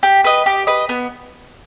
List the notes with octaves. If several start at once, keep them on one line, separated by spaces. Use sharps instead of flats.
G4
B4 D#5
G4
B4 D#5
B3